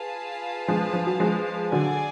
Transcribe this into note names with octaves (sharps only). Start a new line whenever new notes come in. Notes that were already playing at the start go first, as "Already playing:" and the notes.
Already playing: F4 G#4 B4 F5 A5
F3 G#3
F3
F#3
F3 G#3
D3 F#3 G#4 D5 G#5